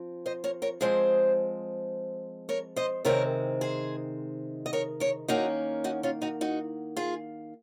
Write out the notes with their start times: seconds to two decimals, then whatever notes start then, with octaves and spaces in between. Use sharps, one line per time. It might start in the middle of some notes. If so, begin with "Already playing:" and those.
Already playing: F3 C4
0.26 C5 D#5
0.44 A#4 C#5
0.62 A#4 C#5
0.81 F3 G#3 C4 G#4 C5
2.49 A#4 C#5
2.76 C5 D#5
3.05 C3 D#3 G#3 C4 A#4 C#5
3.61 G#4 C5
4.66 D#5
4.73 A#4 C#5
5.00 A#4 C#5
5.28 D#3 A#3 C#4 D#4 F#4
5.84 D#4 F#4
6.03 C#4 F4
6.22 D#4 F#4
6.41 D#4 F#4
6.97 F4 G#4